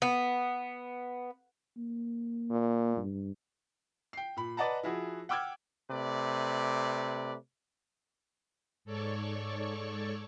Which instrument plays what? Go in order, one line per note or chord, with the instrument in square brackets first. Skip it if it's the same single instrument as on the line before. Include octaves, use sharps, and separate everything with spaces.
[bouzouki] B3
[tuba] A#3
[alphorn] A#2
[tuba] G2
[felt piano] G5 C7
A#2 B5
B4 D5 D#5 F#5 A5 A#5
F3 E4 F#4 G#4
F#5 G5 D6 E6 F6 G#6
[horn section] C3 A3 B4 D5
[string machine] G#2 A4 C#5 D5 C#6